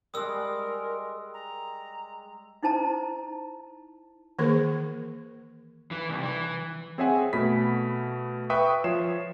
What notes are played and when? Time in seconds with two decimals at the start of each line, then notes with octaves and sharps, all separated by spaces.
0.14 G3 G#3 A#4 D#6 E6
1.34 A#5
2.63 D#4 E4 C5 A5 A#5
4.39 D#3 E3 A#3 G#4 A#4
5.91 E3
6.09 C2
6.23 E3
6.98 C4 G#4 C#5 E5 F#5 G#5
7.33 B2 A3 B5 B6
8.50 B4 E5 G5 C#6 D#6
8.84 F3 C#5 C7 E7